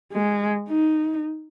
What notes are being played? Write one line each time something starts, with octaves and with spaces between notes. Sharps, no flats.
G#3
D#4